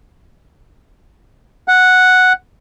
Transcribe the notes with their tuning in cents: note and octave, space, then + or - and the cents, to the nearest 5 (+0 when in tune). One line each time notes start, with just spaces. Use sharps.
F#5 -5